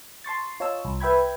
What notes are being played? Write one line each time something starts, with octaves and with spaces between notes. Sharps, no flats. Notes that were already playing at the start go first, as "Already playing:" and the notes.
A5 C6 C#6 A6
F4 C#5 D#5 A5 E6
C2
B4 E5 G5 B5 G#6